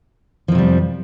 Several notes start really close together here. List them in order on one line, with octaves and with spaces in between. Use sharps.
F3 F2 C3 G3